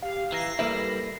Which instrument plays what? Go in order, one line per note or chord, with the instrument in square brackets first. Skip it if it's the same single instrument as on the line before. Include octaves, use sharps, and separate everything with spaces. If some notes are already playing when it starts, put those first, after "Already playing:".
[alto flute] G4 [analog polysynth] F5
[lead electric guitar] E3 [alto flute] A#5 [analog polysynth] A#6 C7
[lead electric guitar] G3 E4 [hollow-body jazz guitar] A#3 B4 E5 [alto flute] A4